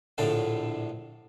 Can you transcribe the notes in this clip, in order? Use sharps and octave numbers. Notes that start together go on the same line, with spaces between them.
A#1 A2 D3 A4 F5